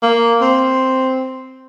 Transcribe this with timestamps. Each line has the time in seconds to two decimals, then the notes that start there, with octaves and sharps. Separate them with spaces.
0.03 A#3
0.41 C4